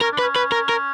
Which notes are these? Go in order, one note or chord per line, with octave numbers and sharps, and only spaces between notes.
C#4 A#4
D4
B4
C#4
B4
A#4
A#4